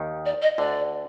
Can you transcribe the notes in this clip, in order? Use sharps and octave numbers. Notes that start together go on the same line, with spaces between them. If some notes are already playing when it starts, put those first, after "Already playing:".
Already playing: D#2 D#3
D5
D#5
D2 D3 D5